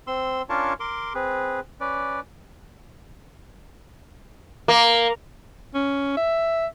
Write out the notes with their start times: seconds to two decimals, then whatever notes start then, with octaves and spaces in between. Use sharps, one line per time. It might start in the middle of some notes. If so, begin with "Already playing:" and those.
0.07 C4 C6 E6
0.50 C#4 D4 F4 A#4 C#5 A5
0.80 A#4 C6 D6
1.15 C4 G#4 B4
1.80 C#4 B4 D5
4.68 A#3
5.74 C#4
6.17 E5